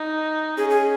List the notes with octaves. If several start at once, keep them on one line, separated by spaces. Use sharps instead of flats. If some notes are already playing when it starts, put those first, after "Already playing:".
Already playing: D#4
C#4 G#4
G#4